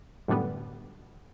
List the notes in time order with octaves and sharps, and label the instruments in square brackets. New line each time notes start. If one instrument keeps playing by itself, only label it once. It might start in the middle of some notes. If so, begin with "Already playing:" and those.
[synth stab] F#2 A2 D3 G3 B3